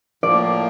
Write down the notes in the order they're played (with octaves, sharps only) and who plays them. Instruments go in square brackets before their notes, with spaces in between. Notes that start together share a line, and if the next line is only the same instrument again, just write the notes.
[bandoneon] A2 F3 A#3 [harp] D5